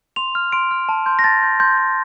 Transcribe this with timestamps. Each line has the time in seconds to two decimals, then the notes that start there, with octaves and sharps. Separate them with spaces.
0.16 C6 F7
0.35 F6
0.52 C6 D7
0.71 F6
0.89 A5
1.06 C6 G6
1.19 A#6
1.24 A5 A6
1.42 C6 G6
1.60 C6 G6
1.78 G6